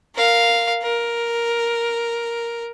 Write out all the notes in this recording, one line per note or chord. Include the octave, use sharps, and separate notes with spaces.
A#4 F5
A#4